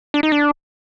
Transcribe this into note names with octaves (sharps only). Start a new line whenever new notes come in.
D4
D#4
D4